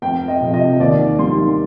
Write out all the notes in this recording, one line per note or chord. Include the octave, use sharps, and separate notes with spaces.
F1 G5
D#5
F2 C3 F3
D#5
D#2 D5
D#3 G3 C6